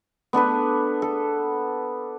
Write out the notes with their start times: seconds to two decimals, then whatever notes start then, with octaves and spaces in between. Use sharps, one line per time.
0.33 B3 D4 A4 B4
1.02 A4